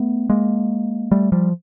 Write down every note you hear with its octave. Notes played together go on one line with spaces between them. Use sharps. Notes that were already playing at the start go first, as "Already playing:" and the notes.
Already playing: A3 B3
G#3 A#3
G3 A3
F3 G3